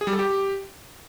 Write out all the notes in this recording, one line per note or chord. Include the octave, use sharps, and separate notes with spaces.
G#4
G3
A4
G4